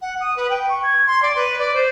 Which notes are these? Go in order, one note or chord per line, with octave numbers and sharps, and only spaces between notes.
F#5
D#6
B4
G5
C#6
G#6
C6
D5
B4
D5
C5